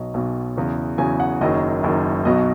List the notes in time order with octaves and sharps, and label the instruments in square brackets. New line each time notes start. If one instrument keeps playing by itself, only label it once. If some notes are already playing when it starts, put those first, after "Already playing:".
Already playing: [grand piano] B1 B2 F#3 D#5
B1 B2 F#3
E2 C#3 F#3
E2 C#3 F#3 G#5
F#5
F#1 F#2 D#3 F#3 D#5
F#1 F#2 D#3 F#3
B1 B2 F#3 D#5